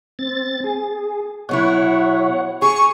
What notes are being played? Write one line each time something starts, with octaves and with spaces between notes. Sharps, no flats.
C4 A6
G#4
B2 F#3 E4 C#5 F#5
G#4 C#6